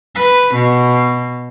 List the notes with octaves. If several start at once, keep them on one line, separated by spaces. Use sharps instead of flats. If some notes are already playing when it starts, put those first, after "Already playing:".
B4
B2